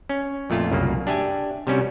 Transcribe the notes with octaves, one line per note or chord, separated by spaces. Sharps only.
C#4
F2 A#2 A3 F4
C2 F#2 C#3 A#3
D4 G4 E5 G#5
C3 G3 C#4 F#4